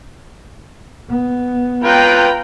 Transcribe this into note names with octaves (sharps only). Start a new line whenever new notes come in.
B3
F4 B4 G5 A#5